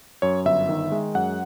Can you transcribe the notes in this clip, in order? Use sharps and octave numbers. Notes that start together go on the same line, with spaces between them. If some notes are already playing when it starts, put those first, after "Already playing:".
F#2 C#5
G1 E5
D#3
G#3
F#2 F#5